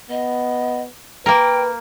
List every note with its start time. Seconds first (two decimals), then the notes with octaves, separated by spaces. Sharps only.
0.10 B3 D#5
1.26 A#3 A#4 B4 G5